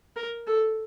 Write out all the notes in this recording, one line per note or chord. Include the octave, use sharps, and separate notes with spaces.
A#4
A4